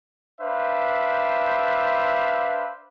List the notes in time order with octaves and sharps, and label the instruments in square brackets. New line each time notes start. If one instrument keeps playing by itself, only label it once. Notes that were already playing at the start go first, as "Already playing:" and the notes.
[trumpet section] D4 B4 C5 E5 F5